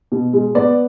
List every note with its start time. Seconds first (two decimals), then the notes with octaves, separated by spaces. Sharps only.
0.12 B2
0.33 G#3
0.55 B3 D5